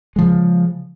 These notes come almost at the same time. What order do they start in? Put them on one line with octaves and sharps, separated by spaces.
G#3 F3 C#3